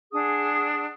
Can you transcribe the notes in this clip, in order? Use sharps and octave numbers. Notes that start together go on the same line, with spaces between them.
D4 G#4 F#5 D#6